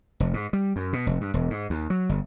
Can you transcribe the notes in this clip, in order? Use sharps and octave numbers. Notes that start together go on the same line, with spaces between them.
F1
G#2
G3
F#2
B2
F1
G2
E1
G#2
D#2
F#3
G1